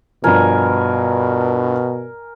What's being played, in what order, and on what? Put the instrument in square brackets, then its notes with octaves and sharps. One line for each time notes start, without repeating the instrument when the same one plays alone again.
[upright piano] G2 F3 [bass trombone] B2 [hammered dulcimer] A#4 G#5